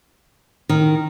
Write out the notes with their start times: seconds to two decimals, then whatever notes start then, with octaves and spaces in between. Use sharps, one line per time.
0.69 D#3